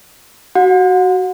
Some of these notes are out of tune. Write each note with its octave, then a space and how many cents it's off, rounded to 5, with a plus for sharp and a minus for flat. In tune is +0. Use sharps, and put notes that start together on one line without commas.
F#4 +10 F#5 -35